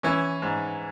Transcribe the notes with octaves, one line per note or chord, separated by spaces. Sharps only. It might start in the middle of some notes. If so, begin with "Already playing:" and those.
E3 C#4 E4
G#2